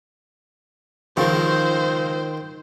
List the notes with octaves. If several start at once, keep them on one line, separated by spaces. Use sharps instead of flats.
C#2 D#3 F3 C5